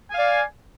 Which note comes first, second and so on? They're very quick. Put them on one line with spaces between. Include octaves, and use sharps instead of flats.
G#5 F5 D5